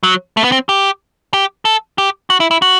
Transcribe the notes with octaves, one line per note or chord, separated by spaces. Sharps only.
F#3
A3
B3
C4
G4
G4
A4
G4
F#4
E4
E4
F#4